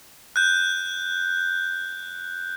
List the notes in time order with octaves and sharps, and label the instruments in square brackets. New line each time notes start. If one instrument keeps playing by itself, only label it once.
[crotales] F#6 G6